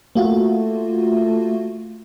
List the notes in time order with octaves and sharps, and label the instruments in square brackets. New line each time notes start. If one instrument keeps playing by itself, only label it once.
[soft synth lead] A3 [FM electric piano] A#3 F4 F#4